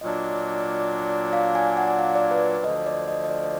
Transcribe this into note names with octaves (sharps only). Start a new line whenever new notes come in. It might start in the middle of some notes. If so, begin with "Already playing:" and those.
A#2 F#3 D4 D#5
F5
G#5
F#5
F5
D5
B4
D2 D3 F3 D#5
D5
D#5
D#5
D5